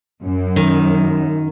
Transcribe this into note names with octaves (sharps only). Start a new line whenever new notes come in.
F#2
D#3